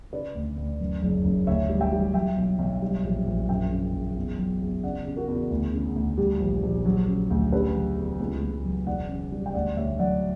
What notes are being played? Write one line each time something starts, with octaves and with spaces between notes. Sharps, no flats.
C#3 B4 D5
D2
D2
F#2
F#1
F#1
D2 C#5 E5
G3
E5 G5
G3
F#3 E5 G5
B1
B1
G3
A#1
A#1
F#2 E5 G5
C#3
F#1
E2
F#3
E2
C#3 D5 F#5
C#3
F#4 A#4
E2
D2
C#3
D2
G3 G4
A#1
A#1
F#3
C#3
D2
C#3 G4 B4
F#3
E2
C#2
C#2
F#3
E1 D5 F#5
C#3
G3
G5
D2 D5 F#5
D2 C#5 E5
F#3 D5 F#5